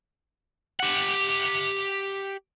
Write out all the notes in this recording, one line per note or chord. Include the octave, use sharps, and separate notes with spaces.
G4 F#5